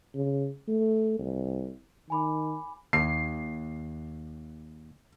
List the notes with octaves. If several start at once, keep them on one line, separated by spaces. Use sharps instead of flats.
C#3
A3
C2
D#3 G#5 B5 D6
D#2 C7